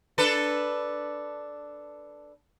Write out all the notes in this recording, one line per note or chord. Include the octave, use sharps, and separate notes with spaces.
D4 A4 B4